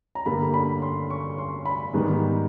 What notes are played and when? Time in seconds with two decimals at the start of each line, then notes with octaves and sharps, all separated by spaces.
0.15 A#5
0.26 G2 D3 G3 A#3 B5
0.54 B5
0.82 C6
1.10 C#6
1.38 C6
1.66 B5
1.93 G#2 D#3 G3 B3